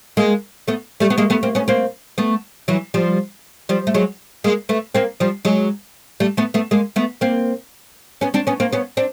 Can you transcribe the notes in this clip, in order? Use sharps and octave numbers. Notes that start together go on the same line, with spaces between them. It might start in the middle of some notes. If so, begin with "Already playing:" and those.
G#3 A#3
A3 B3
G3 A3
B3
G#3 A#3
A3 B3
A#3 C4
B3 C#4
A#3 C4
A3 B3
E3 F#3
F3 G3
F3 G3
A3
F#3 G#3
G#3 A#3
A3 B3
A#3 C4
F3 G3
F#3 G#3
G3 A3
A3 B3
A3 B3
G#3 A#3
A3 B3
A#3 C4
B3 C#4
C4 D4
B3 C#4
A#3 C4
B3 C#4
C4 D4